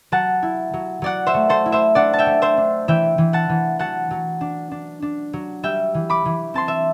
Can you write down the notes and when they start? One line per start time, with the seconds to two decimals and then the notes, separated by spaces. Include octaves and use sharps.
0.12 F#3 F#5 A5
0.43 E4
0.73 F#3
1.02 F#3 D5 F#5
1.27 C5 E5
1.34 A3
1.49 A4 C5
1.66 E4
1.72 C5 E5
1.95 D4 D5 F#5
2.13 A5
2.19 E5 G5
2.26 A3
2.42 C5 E5
2.57 D4
2.88 E3 E5 G5
3.18 E3
3.33 F#5 A5
3.49 E3
3.79 F#3 F#5 A5
4.11 F#3
4.41 D4
4.71 D4
5.02 D4
5.33 F#3
5.63 G3 E5 G5
5.94 E3
6.10 B5 D6
6.25 E3
6.54 C4 A5 C6
6.68 E5